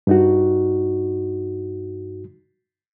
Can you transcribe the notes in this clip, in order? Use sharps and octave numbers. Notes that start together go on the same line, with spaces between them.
G2 D#4 F#4